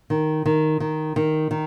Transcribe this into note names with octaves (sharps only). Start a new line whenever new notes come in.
D#3
D#3
D#3
D#3
D#3